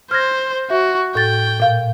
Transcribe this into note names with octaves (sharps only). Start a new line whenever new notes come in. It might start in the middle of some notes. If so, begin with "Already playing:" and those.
C5 F6 G#6 A#6
F#4 E5
A2 G5 A6
A#2 F5